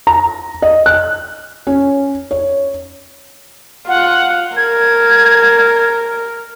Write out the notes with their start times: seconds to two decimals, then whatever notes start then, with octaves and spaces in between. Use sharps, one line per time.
0.07 A#5
0.62 D#5
0.86 F#6
1.67 C#4
2.31 C#5
3.88 F4 F#5
4.57 A#4 G#6